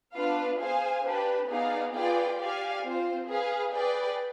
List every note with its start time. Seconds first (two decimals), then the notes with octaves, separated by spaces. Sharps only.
0.14 B3 D4 F4 B4 F5
0.59 G#4 C5 F5 G#5
1.04 D4 G4 B4
1.49 B3 D#4 G#4 D5 F5
1.93 F4 G#4 B4 D5 G5
2.39 G4 D5 F5 G#5
2.83 C4 F4 C5
3.27 G#4 B4 F5
3.72 G#4 B4 D5 G5